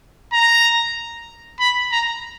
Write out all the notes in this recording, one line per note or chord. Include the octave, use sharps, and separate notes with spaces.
A#5
B5
A#5